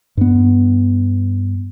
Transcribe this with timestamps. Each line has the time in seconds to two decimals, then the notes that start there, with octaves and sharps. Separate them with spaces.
0.17 G2 B3